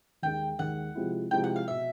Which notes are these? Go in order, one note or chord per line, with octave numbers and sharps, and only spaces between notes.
D#2 D#3 G#3 G5
D#2 D#3 G#3 F#5
C3 F3 G#3 C4 E4
C3 F3 G#3 C4 E4 G5
F#5
F5
B2 E5